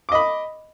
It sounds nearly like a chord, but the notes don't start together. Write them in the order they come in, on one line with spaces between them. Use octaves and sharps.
D6 D#5 B5